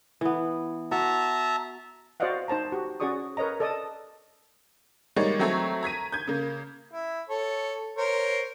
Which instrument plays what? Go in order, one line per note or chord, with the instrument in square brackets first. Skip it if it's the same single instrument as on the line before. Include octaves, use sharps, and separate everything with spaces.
[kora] E3 B3
[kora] F#4 [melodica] E5 A5 A#5
[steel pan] F#4 C5 D5 D#5 F5 F#5
D#4 C5 A5 A#5
F#4 G4
C#4 F#4 G#4 D5 C#6 D#6
A#4 B4 C#5 D#5 A#5
A4 D5 D#5 A5 D#6
[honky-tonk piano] G3 G#3 A#3 D#4 C#5 D5
F#3 A3 C4 A#5 C#6 G#6
A#5 G#6 B6 D#7
G6 G#6
C#3 A#3
[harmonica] E4
A4 C#5
A#4 C5 C#5